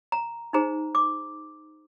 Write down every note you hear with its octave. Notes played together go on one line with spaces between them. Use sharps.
A#5
D#4 G#4 C5 A#5
D6